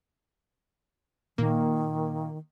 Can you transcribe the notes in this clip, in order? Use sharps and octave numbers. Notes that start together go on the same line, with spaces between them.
A#2 D#3 A#3